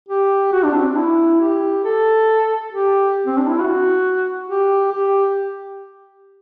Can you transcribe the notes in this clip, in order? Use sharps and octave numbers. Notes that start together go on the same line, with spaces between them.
G4
F#4
D4
C4
D4
E4
G4
A4
G4
C4
D4
E4
F#4
G4
G4